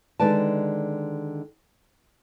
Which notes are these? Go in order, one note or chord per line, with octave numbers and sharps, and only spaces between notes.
D3 D#3 G#3 B4 D5 A5